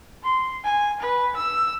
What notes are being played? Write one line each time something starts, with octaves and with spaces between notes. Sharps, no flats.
C6
G#5
B4
E6